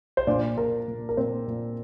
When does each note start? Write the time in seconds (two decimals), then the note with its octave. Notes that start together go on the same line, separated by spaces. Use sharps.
0.17 C5
0.27 A#2 D4 D5
0.57 A#2 A#4
0.88 A#2
1.09 A#4
1.17 A#2 C4 C5
1.48 A#2